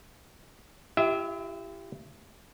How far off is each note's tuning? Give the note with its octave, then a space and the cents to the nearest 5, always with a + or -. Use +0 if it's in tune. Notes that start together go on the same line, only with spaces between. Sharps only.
E4 +40 G4 +0 E5 -25